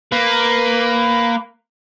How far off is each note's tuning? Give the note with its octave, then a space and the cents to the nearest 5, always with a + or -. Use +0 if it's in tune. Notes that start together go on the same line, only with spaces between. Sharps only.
A#3 +0 B4 +15